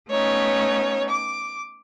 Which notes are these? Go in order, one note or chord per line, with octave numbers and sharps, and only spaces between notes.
A3 B3 C#4 D#4 C#5
D6